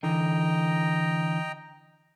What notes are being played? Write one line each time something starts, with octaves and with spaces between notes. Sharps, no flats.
D3 E3 D#5 G5 A#5